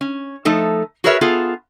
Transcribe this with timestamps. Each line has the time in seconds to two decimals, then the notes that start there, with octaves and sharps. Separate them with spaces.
0.01 C#4
0.45 F3 A3 D#4 A4
1.04 F#4 G#4 A#4 B4 C#5 E5
1.21 B3 F4 G#4 A4